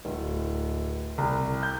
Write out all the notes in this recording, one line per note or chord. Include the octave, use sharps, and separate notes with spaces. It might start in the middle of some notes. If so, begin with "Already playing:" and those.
D1
C2
G6